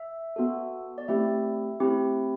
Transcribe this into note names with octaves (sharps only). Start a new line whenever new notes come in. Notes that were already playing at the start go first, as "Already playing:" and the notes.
Already playing: E5
B3 F#4 A4
D5
A3 C4 E4 G4 E5
A3 C4 E4 G4